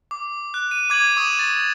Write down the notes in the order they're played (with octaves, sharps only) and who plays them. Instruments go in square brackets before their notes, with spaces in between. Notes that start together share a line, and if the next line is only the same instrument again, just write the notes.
[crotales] D6
F#6
D#7
D6 G#6 D#7 F#7
C#6 D#6 D#7 E7
A6